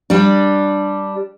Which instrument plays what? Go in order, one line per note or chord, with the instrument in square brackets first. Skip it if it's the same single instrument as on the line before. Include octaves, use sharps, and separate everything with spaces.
[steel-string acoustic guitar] G3 D4